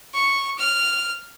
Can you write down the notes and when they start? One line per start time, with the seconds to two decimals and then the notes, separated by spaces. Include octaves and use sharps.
0.14 C#6
0.58 F6